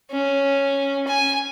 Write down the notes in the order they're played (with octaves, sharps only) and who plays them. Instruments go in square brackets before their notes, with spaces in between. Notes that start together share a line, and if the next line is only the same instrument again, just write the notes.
[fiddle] C#4
G#5